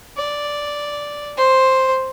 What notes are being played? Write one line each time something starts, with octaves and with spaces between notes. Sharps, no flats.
D5
C5